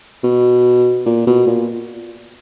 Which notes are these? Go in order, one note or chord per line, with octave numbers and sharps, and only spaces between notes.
B2
A#2
B2
A#2